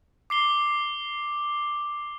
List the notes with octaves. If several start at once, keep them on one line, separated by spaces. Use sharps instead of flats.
D6 C7 G7